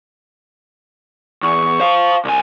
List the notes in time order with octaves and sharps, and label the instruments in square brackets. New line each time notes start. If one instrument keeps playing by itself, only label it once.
[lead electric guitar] E2 [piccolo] C#6
[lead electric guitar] C5 F5
C2 G#5